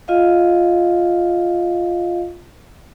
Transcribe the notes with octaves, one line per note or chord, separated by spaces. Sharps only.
F4 D#5 F5